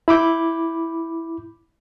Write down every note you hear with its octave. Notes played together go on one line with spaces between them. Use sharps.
E4 B5 D6 G6